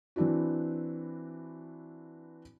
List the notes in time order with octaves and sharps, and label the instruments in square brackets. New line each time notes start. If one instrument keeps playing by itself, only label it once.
[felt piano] E3 C4 D4 E4 F#4